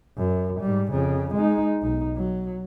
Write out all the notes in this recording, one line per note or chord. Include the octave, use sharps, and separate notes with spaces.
F#2
G#2 G3
F2 C#3
G#3 D#4
B1 D#4
F#3